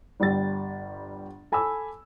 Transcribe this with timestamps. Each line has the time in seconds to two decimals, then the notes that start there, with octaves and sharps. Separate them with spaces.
0.20 G1 G3 G4 A6
1.52 A4 G#5 B5 D6 E6